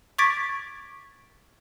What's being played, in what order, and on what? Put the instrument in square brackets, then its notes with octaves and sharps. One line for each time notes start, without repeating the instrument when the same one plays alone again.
[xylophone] C#6 D6 G#6 A6 B6 D7